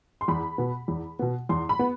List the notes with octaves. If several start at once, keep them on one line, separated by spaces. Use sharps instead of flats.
C6
E2 B5
B2 B3
E2
B2 B3
E2 C6
B5
B3